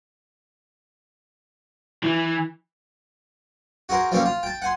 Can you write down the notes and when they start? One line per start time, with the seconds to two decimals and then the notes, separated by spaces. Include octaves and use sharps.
2.03 E3
3.89 F#4 G#4 A#4 C5
4.11 F3 G3 A#3 C4 C#4 G4
4.25 F4
4.43 G5 A5
4.62 F#5 G#5 C6